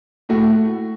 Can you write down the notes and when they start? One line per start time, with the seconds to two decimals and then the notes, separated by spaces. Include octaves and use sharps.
0.29 A2 A3 F#4